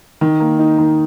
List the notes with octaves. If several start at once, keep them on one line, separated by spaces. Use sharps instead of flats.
D#3
A#3
D#4
D#3